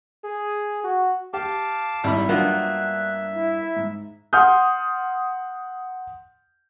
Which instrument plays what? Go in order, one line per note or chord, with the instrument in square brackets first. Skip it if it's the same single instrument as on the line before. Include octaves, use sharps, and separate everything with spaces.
[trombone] G#4
F#4
[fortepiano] G4 [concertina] F5 A5 D6
[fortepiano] G#1 E4 B5 [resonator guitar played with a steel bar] G3 [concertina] E5
[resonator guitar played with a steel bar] G2 A#3 B3 [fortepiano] F#3 D4 F4 [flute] F#6
[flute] E4
[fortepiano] G#2
[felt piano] F#5 C6 D#6 F6 G6